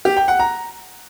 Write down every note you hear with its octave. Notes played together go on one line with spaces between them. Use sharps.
G4
G5
F#5
A#5